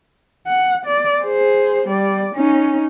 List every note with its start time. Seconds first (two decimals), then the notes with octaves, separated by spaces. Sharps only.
0.47 F#5
0.85 D5
1.23 G#4 C5
1.88 G3 D5
2.35 C#4 D#4